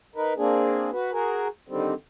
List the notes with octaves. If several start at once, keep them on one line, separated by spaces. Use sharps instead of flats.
D#4 A#4 B4
A#3 C4 D4 G#4
F#4 B4
F#4 G#4 A#4
D3 D#3 G3 C4